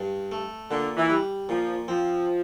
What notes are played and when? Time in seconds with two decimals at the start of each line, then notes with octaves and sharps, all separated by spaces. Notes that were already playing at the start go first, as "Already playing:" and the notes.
Already playing: G2
0.32 A3
0.70 A#2 D3
0.96 E3
1.10 G3
1.49 A#2 F3
1.88 F3 C4